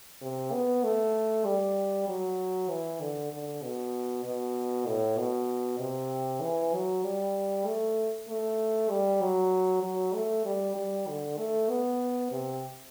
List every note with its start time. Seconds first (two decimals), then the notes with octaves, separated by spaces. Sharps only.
0.22 C3
0.53 B3
0.84 A3
1.45 G3
2.08 F#3
2.69 E3
3.01 D3
3.32 D3
3.63 B2
4.25 B2
4.87 A2
5.18 B2
5.80 C3
6.41 E3
6.74 F#3
7.04 G3
7.66 A3
8.28 A3
8.90 G3
9.22 F#3
9.83 F#3
10.14 A3
10.45 G3
10.76 G3
11.08 D3
11.38 A3
11.69 B3
12.32 C3